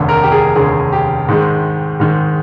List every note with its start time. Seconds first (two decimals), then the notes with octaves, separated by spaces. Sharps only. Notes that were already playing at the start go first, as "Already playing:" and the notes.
Already playing: F1 D#2 D3
0.09 A#4
0.23 G4
0.32 G#4
0.56 F1 D#2 D3 G#4
0.92 G4
1.28 G#2 D#3 G#3
2.00 G#2 D#3 G#3